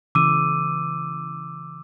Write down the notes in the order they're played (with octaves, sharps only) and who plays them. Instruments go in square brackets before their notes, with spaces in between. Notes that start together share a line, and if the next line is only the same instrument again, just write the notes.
[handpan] C#3 E3 [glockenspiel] D6 E6 D#7